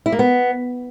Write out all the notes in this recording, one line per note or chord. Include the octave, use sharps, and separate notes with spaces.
E4
A#3
B3